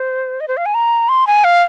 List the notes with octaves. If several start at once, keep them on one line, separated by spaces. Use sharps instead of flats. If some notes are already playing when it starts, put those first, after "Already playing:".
Already playing: C5
D#5
C5
F5
G#5
A#5
C6
G#5
F5